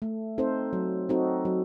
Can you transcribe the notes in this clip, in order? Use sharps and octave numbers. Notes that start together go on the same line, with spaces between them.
A3
C4 D#4 A4 C5
F#3
C4 D#4 F#4 A4
F#3